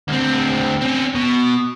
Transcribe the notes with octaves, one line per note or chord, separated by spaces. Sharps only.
D2 C4
C4 C#4
B2